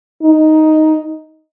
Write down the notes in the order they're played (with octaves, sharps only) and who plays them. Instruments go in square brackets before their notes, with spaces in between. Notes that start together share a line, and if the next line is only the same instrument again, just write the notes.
[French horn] D#4